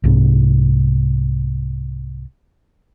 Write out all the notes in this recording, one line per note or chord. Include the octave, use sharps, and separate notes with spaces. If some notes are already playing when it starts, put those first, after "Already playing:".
C2 G#2 C3